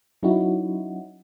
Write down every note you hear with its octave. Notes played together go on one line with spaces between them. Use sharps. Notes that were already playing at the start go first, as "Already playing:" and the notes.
F#3 C#4 D#4 E4 F#4